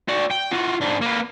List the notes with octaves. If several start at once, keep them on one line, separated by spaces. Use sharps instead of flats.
F#4 D5
G5
F4 F#4
G#2 D4
A#3 B4